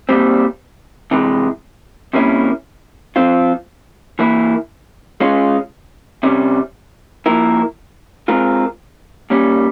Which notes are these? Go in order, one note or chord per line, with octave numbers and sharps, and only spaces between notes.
A#2 G3 C4
C3 E3 G#3
C3 G3 A#3 C#4 E4
F3 C4 F4
E3 A#3 E4
G#3 C#4 F4
C3 G3 C#4
F3 A#3 E4 A#4
G#3 C4 F4 A#4
A#2 G3 C#4